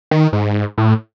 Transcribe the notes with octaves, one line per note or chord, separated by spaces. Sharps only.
D#3
G#2
A2